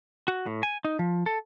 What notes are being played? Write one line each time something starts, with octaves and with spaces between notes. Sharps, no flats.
F#4
A2
G#5
D#4
F3
A4